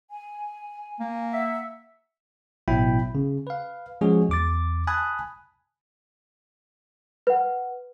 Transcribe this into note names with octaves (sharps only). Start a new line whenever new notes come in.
G#5
A#3
E5 F#5
A1 B2 F#3 E4 G5 B5
C#3
B4 F5
F3 G#3 C#4 F#4 G#4
E2 D6 A6
G#5 A5 B5 D#6 F#6
B4 F#5